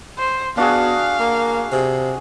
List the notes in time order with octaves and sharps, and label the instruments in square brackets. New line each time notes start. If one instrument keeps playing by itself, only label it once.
[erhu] C5
[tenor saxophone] B3 [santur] D4 F#4 G#4 [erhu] F5
[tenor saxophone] A#3
[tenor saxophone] C3 [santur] G#4